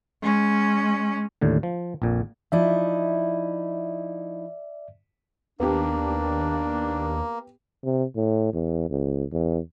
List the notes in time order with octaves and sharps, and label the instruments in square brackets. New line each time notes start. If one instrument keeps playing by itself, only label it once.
[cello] G#3 C#4
[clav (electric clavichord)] D#2 A2 D3
F3
A#1 F2 A#2
[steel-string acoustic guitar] F3 D#4 E4 [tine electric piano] D5 E5
[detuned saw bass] D#2 [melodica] A#3 [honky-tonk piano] B3 G4 [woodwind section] D4
[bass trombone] C3
A2
E2
C#2
E2